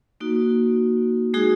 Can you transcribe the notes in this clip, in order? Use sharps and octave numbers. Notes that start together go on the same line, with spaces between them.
A#3 D#4 F#4
G#3 D#4 F#4 G#4